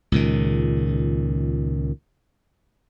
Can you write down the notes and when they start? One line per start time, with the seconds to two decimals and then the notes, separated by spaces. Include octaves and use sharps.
0.12 C#2 A#2 D#3